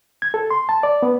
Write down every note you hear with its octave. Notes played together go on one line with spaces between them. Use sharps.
G#6
A4
C6
A5
D5
B3